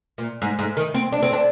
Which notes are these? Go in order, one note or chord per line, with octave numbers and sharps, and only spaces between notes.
A#2
G#2
G#2
D#3
C4
D4
C4
D4